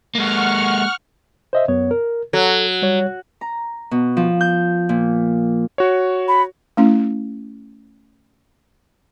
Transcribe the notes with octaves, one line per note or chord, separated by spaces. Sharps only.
G#3 A#3 F#5 C#6 F6
C5 D#5 E5
F#2 B3 C#5
A#4
F#3 A4
G3 C#5
A#5
B2
F3
G6
A#2
F#4 C#5
B5
A3 C#4 E4